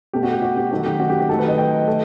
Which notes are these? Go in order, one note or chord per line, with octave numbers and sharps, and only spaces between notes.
B2 A3 G4
F#4
G4
F#4
G4
D#3 F#3 A3 F#4
G4
F#4
G4
G4
D#3 F#3 A3 A4
B4
D#5
G5
A3